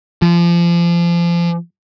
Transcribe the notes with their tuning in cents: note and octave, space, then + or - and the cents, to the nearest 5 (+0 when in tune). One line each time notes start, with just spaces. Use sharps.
F3 -30